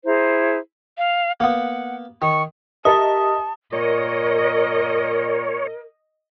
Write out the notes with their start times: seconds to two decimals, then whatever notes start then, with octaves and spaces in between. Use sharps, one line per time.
0.06 E4 G#4 C5 A#5
0.98 F5
1.40 A#3 B3 F#5
2.22 D#3 C#6
2.85 G4 A#4 D#5 E5 A5 D#6
3.73 A#2 A#4 C#5 D#5